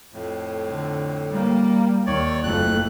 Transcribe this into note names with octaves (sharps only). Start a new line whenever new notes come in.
F2 A2
D3
G3 A#3
D#2 D#3 C#5 D5
F#1 F2 A3 F#6